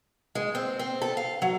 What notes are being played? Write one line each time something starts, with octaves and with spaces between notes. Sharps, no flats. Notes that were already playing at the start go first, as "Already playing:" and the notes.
G#3
C4
C4
A4
F5
F#3